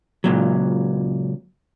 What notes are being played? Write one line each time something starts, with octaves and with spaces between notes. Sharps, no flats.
C#2 A#2 F#3